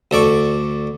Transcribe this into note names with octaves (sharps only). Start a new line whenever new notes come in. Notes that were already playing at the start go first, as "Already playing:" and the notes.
D2 A4 D5 C#6